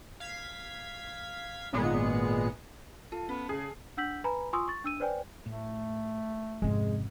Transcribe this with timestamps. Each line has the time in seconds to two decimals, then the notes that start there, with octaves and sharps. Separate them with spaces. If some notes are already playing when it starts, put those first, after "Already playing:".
0.20 F5 G#6 B6
1.73 G#1 A#2 G#3 B3 G#4 C#7
3.12 F4 A4 F5
3.29 B3 C#4
3.49 C#3 G#4
3.97 D4 F#5 E6 G6 B6 F#7
4.24 B4 G#5 A#5 B5
4.53 F4 G#5 C6 C#6 D#6 E6
4.68 C#6 A6
4.84 D4 E6 D#7
5.00 B4 C5 D5 G5 G#5
5.46 A2 A3
6.62 G#1 F2 C3 G#3 C#4